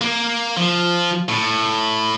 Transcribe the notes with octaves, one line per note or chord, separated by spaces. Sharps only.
A#3
F3
A2